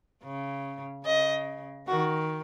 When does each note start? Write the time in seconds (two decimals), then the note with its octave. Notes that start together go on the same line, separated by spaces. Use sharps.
0.24 C#3
1.05 C#3 D#5
1.88 D#3 F#4